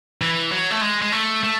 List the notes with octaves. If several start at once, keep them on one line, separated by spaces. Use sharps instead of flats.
E3
F#3
A3
G#3
G#3
A3
A3